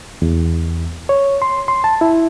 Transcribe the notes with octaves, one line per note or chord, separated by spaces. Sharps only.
E2
C#5
C6
C6
A5
E4